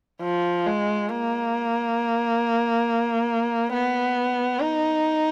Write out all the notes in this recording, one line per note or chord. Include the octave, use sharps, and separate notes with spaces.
F3
G#3
A#3
B3
D#4